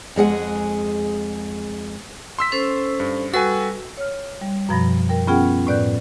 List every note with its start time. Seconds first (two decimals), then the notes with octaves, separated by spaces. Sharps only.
0.16 F2 G#3 G#4 F#5
2.39 C6 E6 B6
2.52 C#4 A4 C5
3.00 G2
3.33 G3 F#4 A4 B4 G#5 E6
3.98 C#5 F6
4.41 G3
4.69 F#2 B2 F3 B5 A6 A#6
5.09 A#4 G5
5.27 B3 C#4 F4 G#4 F#5 G5
5.67 A2 B4 D5 F#6 G6